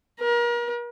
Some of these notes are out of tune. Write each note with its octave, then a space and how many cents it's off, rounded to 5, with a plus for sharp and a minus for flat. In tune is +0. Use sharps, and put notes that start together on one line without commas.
A#4 +35